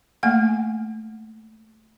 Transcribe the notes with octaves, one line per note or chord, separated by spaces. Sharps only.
A3 A#3 F#5 G#5